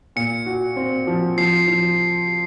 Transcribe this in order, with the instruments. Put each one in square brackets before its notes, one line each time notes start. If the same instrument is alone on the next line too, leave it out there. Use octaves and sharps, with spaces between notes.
[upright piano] A#2 [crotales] C#7
[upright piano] F#4
C4
F3
[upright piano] F3 [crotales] C7
[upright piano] F3